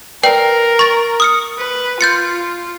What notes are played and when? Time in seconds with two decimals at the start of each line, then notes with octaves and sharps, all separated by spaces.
0.23 A#4 B4 D5 G5
0.79 C#6 A6
1.20 D#6 F6 C#7
1.58 B4
2.01 F4 G6 A6 C#7